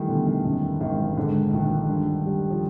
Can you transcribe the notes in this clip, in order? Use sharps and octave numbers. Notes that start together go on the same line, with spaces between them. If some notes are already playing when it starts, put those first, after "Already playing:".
Already playing: D#3 E3 G3 A3
D3 B3
D#3
F#2 D#3
G#1 D#3
G#2 D3
A#1 D#3
G2
G3
F3